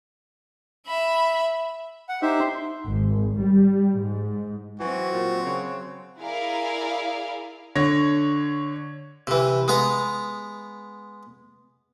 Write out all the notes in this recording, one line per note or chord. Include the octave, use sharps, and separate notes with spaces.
E5 B5
F#5
D#4 G4 C5 E5
C6
G#1
G3
G#2
E3 F#3 C4 F#4
A#2
C#3
E4 G#4 A#4 D5 F5
D3 C#5 A#6
C3 E3
G#3 B3 A#5